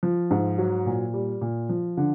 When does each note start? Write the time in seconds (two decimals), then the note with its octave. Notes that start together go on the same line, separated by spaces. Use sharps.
0.03 F3
0.31 G#2
0.58 F#3
0.86 A#2
1.14 G3
1.41 A#2
1.69 F3
1.97 D3